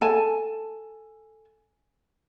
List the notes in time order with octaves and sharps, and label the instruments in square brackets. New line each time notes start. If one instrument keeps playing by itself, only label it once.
[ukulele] A4 G#5 A5